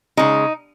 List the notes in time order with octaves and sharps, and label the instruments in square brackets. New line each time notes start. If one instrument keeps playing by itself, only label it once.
[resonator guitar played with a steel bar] C#3 G#3 D#4